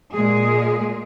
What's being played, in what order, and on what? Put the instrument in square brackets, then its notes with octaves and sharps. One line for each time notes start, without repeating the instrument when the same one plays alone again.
[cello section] A#2 G#3 G#4